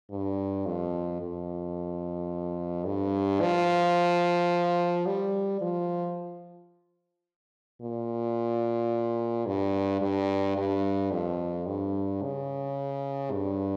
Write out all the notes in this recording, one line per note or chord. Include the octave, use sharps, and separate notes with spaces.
G2
F2
F2
G2
F3
G3
F3
A#2
G2
G2
G2
F2
G2
C#3
G2